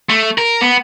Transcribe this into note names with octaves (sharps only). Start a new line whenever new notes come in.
A3
A#4
B3